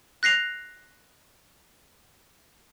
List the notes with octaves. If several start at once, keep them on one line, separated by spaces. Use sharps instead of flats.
F#6 A#6 C7 F7